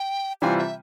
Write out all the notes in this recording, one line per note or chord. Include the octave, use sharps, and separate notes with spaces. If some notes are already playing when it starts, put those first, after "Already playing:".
Already playing: G5
C3 E3 G3 C4 F4 G#5
E5